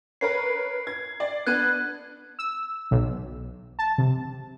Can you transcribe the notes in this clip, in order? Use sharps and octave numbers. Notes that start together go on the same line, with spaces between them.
A#4 B4 C#5 C7
G#6
D5
B3 D4 F#6 G#6 D#7
E6
B1
A5
C3